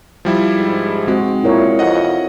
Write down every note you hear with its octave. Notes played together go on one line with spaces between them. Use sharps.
F3 G3 E4
G#2
G#3 C4 F#4
A#2 E4 A#4 C#5
F2 D#5 F#5